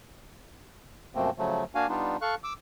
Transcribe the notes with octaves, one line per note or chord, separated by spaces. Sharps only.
F#2 B2 F3 A3 A#3 C4
C#3 F3 F#3 A3
A#3 D4 F#4 F5 G#5
G3 B3 D4 D#4 F4
A4 F5 C#6 F#6
D6 E6